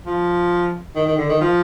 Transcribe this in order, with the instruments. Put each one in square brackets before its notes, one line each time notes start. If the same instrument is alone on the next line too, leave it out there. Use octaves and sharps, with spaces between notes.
[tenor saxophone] F3
D#3
D#3
D3
D#3
F3